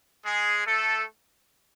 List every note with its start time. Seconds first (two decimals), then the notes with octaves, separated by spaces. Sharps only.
0.25 G#3 G#4
0.66 A3 A4